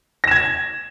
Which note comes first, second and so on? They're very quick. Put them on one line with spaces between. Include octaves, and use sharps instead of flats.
A#6 E7 G#6